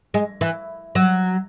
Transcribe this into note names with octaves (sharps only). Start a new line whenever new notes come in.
G#3
E3
F#3